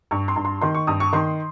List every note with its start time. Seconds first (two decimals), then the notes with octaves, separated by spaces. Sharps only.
0.11 G2 C#6
0.28 C6
0.36 G2
0.45 C6
0.61 D#3 C6
0.75 C#6
0.87 G2 D#6
1.00 C#6
1.13 D#3 C6